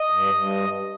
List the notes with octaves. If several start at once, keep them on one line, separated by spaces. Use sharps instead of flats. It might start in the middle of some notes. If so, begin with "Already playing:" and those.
Already playing: D#5
G2
G2